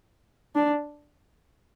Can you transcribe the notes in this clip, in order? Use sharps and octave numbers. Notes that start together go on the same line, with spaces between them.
D4